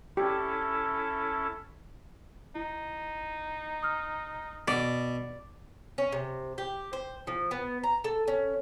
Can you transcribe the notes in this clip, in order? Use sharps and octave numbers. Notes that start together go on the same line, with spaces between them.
C#4 E4 G4 A4
D#4 E4
D#6 F6
B2 D5
C#4
C3
G4
C5
F3
B3
A#5
A4
C#4